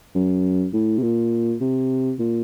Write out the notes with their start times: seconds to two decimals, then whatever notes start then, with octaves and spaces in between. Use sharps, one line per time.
0.15 F#2
0.73 A2
0.98 C3
1.02 A#2
1.61 C3
2.19 A#2